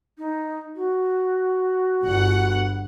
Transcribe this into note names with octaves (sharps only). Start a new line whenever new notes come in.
D#4
F#4
G1 F#5